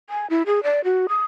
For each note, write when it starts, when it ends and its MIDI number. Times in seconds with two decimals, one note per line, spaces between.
0.10 0.27 80
0.30 0.42 64
0.46 0.63 68
0.63 0.81 74
0.84 1.07 66
1.09 1.24 87